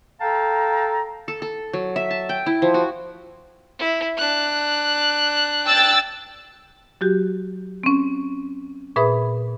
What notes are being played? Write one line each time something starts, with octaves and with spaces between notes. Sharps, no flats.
A4 F5 G5 A5 A#5
A4
A4
F#3
E5
A5
G5
E4
F3
F#4
E4
D4 F#6
G5 E6 A6
F#3 F#4 G4
C4 C#4
A#2 G#4 B4 E5 B5 D#6